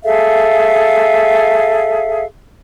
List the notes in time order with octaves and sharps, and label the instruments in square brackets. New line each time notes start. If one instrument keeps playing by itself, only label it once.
[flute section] G#4 A4 E5 F5